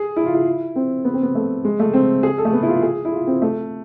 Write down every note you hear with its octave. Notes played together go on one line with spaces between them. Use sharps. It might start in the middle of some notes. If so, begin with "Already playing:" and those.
Already playing: G#4
E4
F4
E4
C4
B3
C4
B3
A3
G#3
A3
C4
G#4
A4
A3
B3
E4
F4
G#4
E4
F4
C4
A3